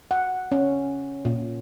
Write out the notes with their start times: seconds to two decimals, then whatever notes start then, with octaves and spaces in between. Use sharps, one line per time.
0.11 F#5
0.52 C#4
1.25 A#2